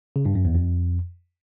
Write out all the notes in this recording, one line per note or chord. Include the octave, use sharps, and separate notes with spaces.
C#3
G2
F#2
E2
F2